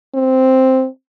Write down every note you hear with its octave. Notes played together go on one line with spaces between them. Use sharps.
C4